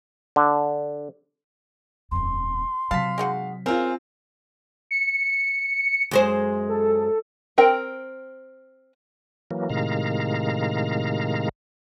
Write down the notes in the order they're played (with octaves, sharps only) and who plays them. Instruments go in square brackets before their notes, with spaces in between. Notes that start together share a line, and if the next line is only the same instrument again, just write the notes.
[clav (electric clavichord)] D3
[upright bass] D#1 F2 [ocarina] C6
[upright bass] C3 F#3 [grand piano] F5 B6 [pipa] A5
[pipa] G#3 D#4 F#4
[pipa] C#3 A#4 [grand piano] C4 F4 [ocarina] G#5
[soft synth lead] C#7
[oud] F#2 G#3 C5
[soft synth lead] A4
[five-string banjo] C4 A#4 G5
[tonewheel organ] E3 F#3 A#3
A2 C3 D#3 G#3 F5 A#5